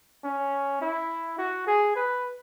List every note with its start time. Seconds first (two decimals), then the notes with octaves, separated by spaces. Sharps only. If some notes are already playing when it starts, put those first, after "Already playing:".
0.24 C#4
0.82 E4
1.38 F#4
1.67 G#4
1.96 B4